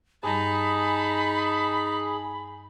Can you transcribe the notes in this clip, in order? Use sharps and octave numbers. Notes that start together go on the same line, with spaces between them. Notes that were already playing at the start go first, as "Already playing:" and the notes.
G2 G3 D#4 G#4 A5 B5